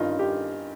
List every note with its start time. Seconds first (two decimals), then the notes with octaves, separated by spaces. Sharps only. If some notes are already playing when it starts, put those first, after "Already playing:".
Already playing: G2 D#3 C#4 D#4 F4
0.19 G4